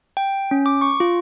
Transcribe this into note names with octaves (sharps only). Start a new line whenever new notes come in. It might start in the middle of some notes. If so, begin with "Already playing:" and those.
G5
C#4
D6
C#6
F4